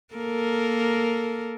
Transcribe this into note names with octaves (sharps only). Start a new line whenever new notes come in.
A#3 A4 A#4